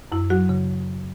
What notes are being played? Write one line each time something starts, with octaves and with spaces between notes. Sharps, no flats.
F#2 E4
F#3 F#4
C#3